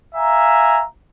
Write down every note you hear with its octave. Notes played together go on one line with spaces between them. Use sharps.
E5 F5 G#5 A#5